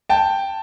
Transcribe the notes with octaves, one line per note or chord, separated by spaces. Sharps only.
G5 A5